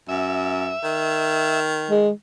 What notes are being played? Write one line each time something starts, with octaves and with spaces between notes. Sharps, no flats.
F#2 E5
D#3
G#3